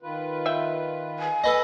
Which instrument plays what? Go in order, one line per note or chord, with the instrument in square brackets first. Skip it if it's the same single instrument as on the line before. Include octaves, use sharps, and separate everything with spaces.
[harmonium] D#3 F4 B4
[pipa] E5 G5
[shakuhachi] G#5
[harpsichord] A4 B4 D#5